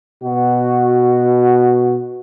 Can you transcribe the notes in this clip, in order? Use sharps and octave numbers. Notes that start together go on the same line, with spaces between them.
B2 F#4